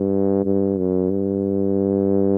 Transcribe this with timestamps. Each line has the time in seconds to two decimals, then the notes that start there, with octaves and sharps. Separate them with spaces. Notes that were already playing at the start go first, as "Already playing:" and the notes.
Already playing: G2
0.45 G2
0.78 F#2
1.10 G2